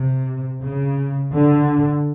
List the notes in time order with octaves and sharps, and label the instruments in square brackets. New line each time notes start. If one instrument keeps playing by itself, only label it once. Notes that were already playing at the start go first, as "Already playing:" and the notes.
Already playing: [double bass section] C3
C#3
D3